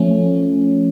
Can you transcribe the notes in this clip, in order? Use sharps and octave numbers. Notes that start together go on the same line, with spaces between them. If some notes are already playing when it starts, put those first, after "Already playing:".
Already playing: F3 A3 C#4